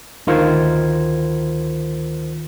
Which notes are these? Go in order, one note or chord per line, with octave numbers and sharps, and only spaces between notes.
D2 D#3 F4 A#4 C5 G#6